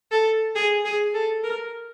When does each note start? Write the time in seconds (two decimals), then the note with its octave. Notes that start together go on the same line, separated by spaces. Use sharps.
0.11 A4
0.55 G#4
0.85 G#4
1.14 A4
1.44 A#4